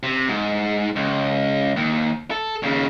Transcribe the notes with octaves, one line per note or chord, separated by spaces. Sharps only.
C3
G#2
C#2
D#2
A4
D#2 C#3